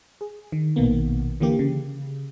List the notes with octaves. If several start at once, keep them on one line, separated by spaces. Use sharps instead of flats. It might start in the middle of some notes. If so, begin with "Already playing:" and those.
G#4
D#3
A#1 B2 D#3 A#3 B3
D3 E3 A#3 G4
C#3